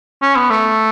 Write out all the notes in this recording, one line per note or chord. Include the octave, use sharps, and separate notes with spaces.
C#4
B3
A3